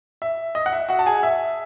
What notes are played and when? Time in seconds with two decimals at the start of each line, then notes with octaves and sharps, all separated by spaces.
0.22 E5
0.55 D#5
0.66 F#5
0.73 E5
0.89 F#4 F#5
0.99 A5
1.06 G#4 G#5
1.23 E5